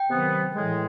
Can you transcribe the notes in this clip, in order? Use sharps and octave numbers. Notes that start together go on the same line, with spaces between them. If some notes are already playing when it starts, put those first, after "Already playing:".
Already playing: G5
C3 D#3 F#3 B3
A2 E3 G#3